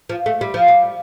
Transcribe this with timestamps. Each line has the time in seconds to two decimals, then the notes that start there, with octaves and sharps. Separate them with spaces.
0.09 F3
0.26 A3
0.41 G3
0.54 F3
0.68 G3